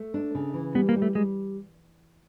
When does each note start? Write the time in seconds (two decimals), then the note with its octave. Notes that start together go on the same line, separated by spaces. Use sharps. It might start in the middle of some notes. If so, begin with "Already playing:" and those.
Already playing: A3
0.14 D4
0.35 C#3
0.54 E3
0.75 G3 B3
0.89 A#3
0.96 G3
1.02 A3
1.15 G3 G#3